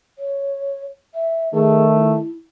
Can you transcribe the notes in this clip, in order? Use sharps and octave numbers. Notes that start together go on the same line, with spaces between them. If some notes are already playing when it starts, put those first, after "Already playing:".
C#5
E5
D#3 A3 G#4
E4